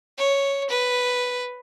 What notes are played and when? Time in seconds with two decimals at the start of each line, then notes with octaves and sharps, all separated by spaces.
0.17 C#5
0.69 B4